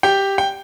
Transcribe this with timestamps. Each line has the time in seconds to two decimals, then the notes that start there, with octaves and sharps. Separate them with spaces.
0.03 G4 G5
0.38 G5